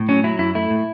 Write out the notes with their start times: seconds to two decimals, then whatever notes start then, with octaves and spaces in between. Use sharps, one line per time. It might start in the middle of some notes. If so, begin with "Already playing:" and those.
Already playing: A2
0.09 F#3 C#4
0.24 F#3 E4
0.39 F#2 E4
0.55 A3 E4
0.70 A2